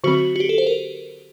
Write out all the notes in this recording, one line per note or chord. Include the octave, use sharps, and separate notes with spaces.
D3 F#3 C4 F#4
F#4
G4
A4
C5
A#4